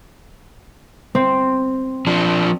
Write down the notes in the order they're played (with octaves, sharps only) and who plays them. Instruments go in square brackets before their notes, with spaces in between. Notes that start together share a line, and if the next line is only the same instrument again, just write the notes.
[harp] C4
[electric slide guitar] F3 D4